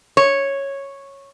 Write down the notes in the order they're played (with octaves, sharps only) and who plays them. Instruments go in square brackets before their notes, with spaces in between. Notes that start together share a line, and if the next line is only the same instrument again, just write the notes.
[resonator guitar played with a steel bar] C#5